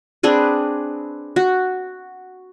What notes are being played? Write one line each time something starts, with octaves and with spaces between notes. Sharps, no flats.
C4 D4 G#4 B4
F#4